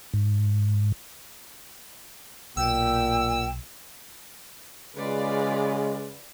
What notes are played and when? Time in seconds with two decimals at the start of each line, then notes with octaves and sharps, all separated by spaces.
0.14 G#2
2.57 B1 A#2 G5 E6
4.97 C#3 G#3 F4 B4 D5